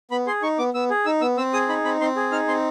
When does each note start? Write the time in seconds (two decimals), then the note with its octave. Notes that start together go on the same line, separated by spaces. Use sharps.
0.11 B3 B5
0.27 G#4 C6
0.42 D#4 C#6
0.59 B3 D6
0.74 B3 E6
0.90 G#4
1.06 D#4 E6
1.21 B3 E6
1.37 C4 E6
1.53 G#4 D#6
1.69 D#4 B5
1.84 C4 B5
2.01 C4 C6
2.16 G#4
2.32 D#4 F6
2.48 C4 C6